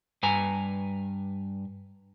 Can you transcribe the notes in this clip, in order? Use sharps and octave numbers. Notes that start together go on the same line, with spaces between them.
G2 B4 G#5 A#5